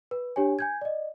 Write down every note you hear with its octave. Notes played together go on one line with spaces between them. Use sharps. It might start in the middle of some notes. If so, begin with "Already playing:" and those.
B4
D4 G4 C#5 G#5
G#5 G6 G#6
D5 D#5